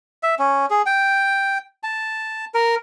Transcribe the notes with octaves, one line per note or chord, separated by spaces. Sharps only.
E5
C#4
G#4
G5
A5
A#4